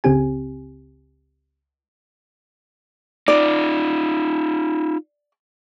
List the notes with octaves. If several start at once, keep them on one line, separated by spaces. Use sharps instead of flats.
G1 C#2 C#3 C4 G4 G#5
D#4 F4 D5